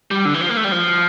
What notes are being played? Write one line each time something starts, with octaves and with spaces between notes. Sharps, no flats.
G3
D3
E3
F3
A#3
A3
G3
F3